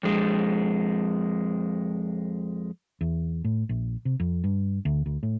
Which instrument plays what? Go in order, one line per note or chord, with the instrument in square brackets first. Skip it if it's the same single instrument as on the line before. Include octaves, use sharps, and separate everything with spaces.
[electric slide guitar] F2 G#3
[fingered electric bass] E2
A2
A#1
C3
F2
G2
D2
D2
A2